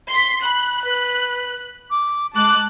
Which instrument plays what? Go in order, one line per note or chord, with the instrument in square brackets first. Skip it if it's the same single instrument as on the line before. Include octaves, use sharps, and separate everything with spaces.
[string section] C6 B6
[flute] B5 [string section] F#6
[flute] B4
D6
[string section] G#3 A5 F#6 [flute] D6